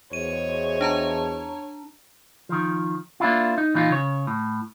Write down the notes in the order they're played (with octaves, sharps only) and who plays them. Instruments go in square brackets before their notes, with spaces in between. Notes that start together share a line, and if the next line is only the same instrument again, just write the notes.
[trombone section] E2 [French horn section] F#3 C5 D#5 [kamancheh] C#5 [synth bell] D#7
[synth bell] D4 A5 A#5
[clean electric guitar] D#3 F3
A#3 D4 E4 F4
D#4
A#2 E3 D#4 F4
C#3 C#5
A2